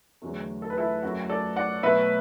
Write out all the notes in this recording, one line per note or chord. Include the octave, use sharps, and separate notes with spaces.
E2 D3 F#3 A3
A4
B4
E4 A4
F#2 F#3 A3 F#4
A4 D5
D5 F#5
B2 F#3 A3 B4 E5